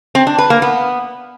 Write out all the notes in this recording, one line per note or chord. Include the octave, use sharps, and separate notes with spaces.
C4
D4
B4
A#3
B3